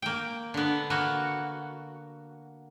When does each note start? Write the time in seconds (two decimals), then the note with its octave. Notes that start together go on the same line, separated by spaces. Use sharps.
0.02 A#3 G5
0.54 D3 B3
0.90 A#3 B3 F#4